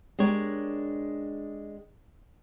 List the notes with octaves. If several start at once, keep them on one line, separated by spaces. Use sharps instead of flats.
G#3 D4 G4 A#4 C#5